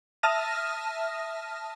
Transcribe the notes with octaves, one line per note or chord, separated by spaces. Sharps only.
E5 A5 D#6 F6 A#6 D#7